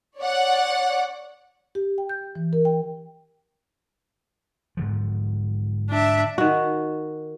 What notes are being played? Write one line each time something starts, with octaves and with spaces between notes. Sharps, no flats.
C#5 D5 F#5
G4
G5
G6
E3
A#4
G5
G#2 D3 F3
D4 E5
D#3 F#4